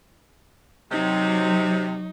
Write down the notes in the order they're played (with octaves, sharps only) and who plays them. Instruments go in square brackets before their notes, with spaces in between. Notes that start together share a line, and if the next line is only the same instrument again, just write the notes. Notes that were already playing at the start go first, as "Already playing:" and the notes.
[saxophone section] C3 [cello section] F#3 [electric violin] D#4